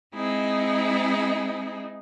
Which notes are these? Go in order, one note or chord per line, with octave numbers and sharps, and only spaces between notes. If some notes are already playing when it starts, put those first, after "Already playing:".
G#3 C4 D#4 E4 G#4